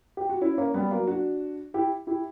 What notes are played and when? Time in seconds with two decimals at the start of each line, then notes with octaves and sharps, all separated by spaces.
0.17 G4
0.29 F#4
0.41 C#4 E4
0.58 A#3 C#4
0.74 G3 B3
0.91 F#3 A#3
1.07 D4 F#4
1.74 E4 G4
2.07 E4 G4